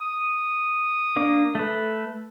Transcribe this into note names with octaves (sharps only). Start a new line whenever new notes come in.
D#6
A#3 D4 D6
A3 A4 B4